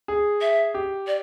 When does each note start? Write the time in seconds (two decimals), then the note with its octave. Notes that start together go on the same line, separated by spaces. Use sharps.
0.08 G#4
0.41 E5
0.74 G4
1.07 D5